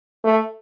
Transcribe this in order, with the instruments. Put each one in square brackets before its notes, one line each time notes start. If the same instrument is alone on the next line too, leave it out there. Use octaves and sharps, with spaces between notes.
[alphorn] A3